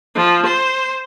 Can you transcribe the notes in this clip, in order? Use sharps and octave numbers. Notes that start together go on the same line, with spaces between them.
F3
C5